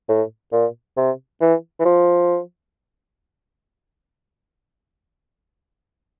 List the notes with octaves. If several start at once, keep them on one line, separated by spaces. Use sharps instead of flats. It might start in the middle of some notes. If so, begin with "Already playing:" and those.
A2
A#2
C3
E3
E3
F3